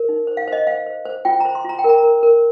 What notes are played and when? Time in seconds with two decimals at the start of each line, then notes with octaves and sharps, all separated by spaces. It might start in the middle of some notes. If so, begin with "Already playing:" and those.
Already playing: A#4
0.09 D#4
0.27 C5
0.37 F5
0.48 C5 D#5
0.67 C5 F5
0.86 C5
1.05 C5
1.25 F4 G5
1.40 C5 A#5
1.55 C6
1.64 F4 A#5
1.79 G5
1.84 A#4 A#5
2.03 A#4
2.23 A#4